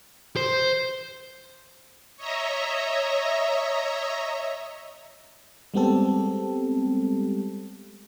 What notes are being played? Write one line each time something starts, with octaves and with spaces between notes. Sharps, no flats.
C5
C#5 D#5 E5 A#5
G3 G#3 B3 C4 G4 A4